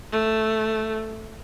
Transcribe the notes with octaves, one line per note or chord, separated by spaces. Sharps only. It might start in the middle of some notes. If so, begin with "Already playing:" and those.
A3